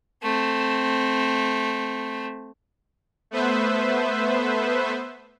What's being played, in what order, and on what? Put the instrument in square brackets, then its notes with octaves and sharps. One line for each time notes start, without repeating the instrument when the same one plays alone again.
[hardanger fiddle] A3 C4
[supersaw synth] A3 B3 B4 C5 E5